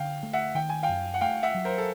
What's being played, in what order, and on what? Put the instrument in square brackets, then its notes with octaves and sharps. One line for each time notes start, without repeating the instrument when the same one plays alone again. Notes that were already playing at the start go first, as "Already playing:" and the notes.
Already playing: [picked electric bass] D3 [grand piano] F5 G5
[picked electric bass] A3
[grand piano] E5 F#5
[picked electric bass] D#3 [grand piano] G5
[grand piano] G#5
F5 G5
[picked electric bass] F#2
[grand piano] F#5
[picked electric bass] A3 [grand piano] F5 G5
[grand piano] E5 F#5
[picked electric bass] F#3
[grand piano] A#4 C5
A4